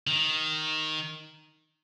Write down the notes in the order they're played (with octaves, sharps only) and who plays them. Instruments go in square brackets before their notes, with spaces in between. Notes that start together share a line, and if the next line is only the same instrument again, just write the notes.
[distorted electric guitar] D#3